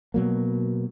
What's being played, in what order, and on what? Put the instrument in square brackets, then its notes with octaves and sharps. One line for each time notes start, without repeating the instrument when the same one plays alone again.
[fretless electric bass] B2 F#3 A#3